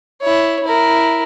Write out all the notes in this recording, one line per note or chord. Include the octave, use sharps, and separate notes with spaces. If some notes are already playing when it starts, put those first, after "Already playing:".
E4 C#5
E4 A#4